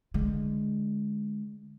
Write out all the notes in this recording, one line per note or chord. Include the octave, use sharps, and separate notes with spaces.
D3 G#3